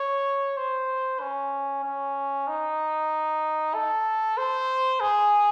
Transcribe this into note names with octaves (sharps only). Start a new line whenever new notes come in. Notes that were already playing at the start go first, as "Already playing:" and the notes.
Already playing: C#5
C5
C#4
C#4
D#4
A4
C5
G#4